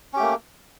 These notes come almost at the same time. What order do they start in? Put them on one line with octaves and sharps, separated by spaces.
C#4 G4 A3 A#3